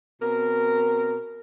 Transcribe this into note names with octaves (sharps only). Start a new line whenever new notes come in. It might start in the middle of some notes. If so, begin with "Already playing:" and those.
B2 C4 A#4